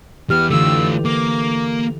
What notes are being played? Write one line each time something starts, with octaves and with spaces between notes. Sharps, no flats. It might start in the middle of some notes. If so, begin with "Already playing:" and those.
E3 B3 G4 F6
D3 E3 A3 F4 E6
A#3 D6